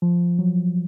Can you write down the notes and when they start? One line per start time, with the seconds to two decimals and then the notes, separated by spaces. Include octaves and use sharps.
0.02 F3
0.39 F#3